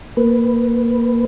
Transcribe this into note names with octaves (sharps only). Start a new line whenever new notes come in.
A#3 B4